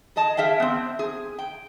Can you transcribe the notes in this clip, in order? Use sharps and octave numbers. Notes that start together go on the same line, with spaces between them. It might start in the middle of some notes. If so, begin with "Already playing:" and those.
G#4 A4 D#5 A5
G#4 E5 F5 G5
B3 C4
G#4
G5